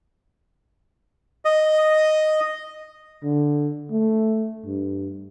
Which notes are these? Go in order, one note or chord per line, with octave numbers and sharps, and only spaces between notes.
D#5
D3
A3
G2